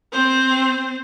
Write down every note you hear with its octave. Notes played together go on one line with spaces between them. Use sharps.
C4 C5